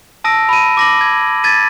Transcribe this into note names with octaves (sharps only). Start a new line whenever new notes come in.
A5 D#6 E6 A#6 D7
B5 D#7
D6 A#6 F#7
G#6
G#6 A6 B6 D#7